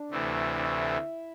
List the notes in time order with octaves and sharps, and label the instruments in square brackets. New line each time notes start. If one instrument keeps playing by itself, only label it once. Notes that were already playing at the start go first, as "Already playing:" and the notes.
Already playing: [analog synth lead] D4
[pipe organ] D2 C3 E3 A3
[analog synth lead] E4